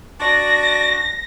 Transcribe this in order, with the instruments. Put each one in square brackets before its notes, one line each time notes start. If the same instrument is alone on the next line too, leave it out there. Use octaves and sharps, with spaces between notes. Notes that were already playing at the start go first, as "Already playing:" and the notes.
[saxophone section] D4 F#4 D5 [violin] A#6